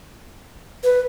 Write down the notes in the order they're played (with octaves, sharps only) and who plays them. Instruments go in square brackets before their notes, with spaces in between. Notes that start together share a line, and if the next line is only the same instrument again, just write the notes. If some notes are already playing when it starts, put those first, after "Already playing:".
[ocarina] B4